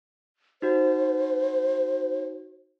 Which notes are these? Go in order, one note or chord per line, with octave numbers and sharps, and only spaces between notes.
D#4 F#4 C5